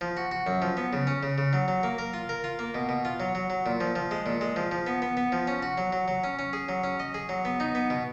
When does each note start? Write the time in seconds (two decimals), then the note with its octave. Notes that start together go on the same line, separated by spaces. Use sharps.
0.01 F3
0.17 F#4
0.31 F#4
0.47 F#2
0.62 F3
0.77 B3
0.93 C#3
1.07 C#4
1.23 C#3
1.38 C#3
1.53 F#3
1.68 F#3
1.83 A#3
1.98 A#4
2.13 F4
2.29 A#4
2.44 F4
2.59 A#3
2.74 B2
2.89 B2
3.05 F4
3.20 F#3
3.35 F#3
3.50 F#3
3.66 A#2
3.80 F3
3.96 F3
4.11 G#3
4.26 A#2
4.41 G#3
4.56 F3
4.71 F3
4.86 B3
5.02 B3
5.17 B3
5.32 F3
5.47 C#4
5.63 F#4
5.78 F#3
5.92 F#3
6.08 F#3
6.24 C#4
6.39 C#4
6.53 G#4
6.69 F#3
6.84 C#4
7.00 D#5
7.14 G#4
7.29 F#3
7.45 B3
7.60 D#4
7.75 B3
7.90 B2